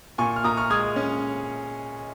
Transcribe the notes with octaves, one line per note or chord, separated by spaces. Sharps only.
A#2 G#5 C#6
F6
A#2 A#5 D#6
C#6 F6
G#3 D#6 G#6
C#4